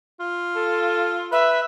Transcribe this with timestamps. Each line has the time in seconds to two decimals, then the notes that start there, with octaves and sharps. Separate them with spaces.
0.20 F4
0.56 A4
1.32 B4 E5